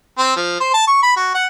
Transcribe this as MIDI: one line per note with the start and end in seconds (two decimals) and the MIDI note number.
0.18 0.33 60
0.36 0.58 53
0.60 0.73 72
0.74 0.86 81
0.87 0.99 85
1.03 1.16 83
1.16 1.30 66
1.35 1.46 78